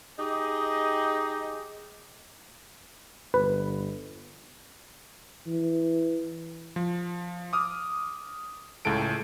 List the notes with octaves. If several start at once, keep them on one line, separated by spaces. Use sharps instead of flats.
D#4 G4 G#4 D#5
G1 B4
E3
F3
D6 D#6 F6
C#2 A2 G#3 A4 D7